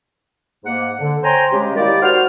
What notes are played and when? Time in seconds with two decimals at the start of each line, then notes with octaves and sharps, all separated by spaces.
0.65 G#2 A#3 F#5
0.99 D3
1.24 C5 C#5 G5 G#5 A#5 C6
1.52 C#3 G#3 G4
1.76 D#3 A#3 E4 G4 D5
2.02 F#4 C5 F6